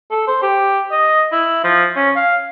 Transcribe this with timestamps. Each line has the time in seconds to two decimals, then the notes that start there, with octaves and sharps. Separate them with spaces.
0.11 A4
0.27 C5
0.42 G4
0.91 D#5
1.32 E4
1.64 F3
1.96 C#4
2.16 F5